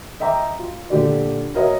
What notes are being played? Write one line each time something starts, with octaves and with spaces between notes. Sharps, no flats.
D#5 E5 G5 A#5 D6
F4
A#2 D3 G4 D5
F#4 A#4 C#5 D#5 E5